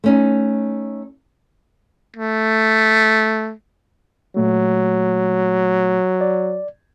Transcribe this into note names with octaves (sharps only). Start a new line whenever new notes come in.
A3 C#4 D#4
A3
A#2 F#3 A3
D5